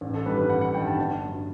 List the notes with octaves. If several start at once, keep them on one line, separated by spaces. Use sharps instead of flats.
A1
A4
G2 D#3 G3 B4
B4
A1 F#5
F#5
G2 D#3 G3 G5
A5
G1
G2 F#3